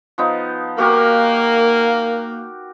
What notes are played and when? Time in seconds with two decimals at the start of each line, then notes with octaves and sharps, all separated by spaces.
0.18 F3 B3 D#4
0.78 A#3 F#4 G4 A#4